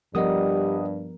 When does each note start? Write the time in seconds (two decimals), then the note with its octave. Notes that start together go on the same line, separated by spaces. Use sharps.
0.15 G2 F3 G3 B3 A#4 D#5 F#5 D#6